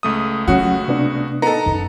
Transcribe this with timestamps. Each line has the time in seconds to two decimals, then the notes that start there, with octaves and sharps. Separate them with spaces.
0.03 C#2 A3 D#6
0.48 F#3 C#4 F4 F#4 F#5
0.88 C3 B3 D4
1.42 B3 D#4 A4 A#5
1.66 F#2